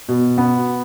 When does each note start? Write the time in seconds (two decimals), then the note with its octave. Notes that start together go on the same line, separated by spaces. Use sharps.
0.08 B2
0.38 B3